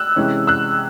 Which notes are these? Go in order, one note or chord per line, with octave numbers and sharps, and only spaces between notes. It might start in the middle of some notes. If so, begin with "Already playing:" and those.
Already playing: E6 F#6
C3 E3 G#3 C#4
E6 F#6